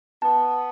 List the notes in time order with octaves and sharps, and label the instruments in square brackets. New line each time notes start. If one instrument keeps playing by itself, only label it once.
[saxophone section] B3 [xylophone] A5